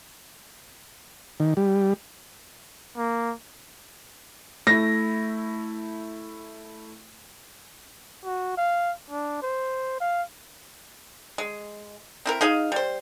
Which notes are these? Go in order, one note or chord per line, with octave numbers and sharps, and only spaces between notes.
D#3
G3
A#3
A3 E4 A#6
F#4
F5
D4
C5
F5
G#3
C4 E4 A#4
D#4 G#4 D#5 F5
G3 C5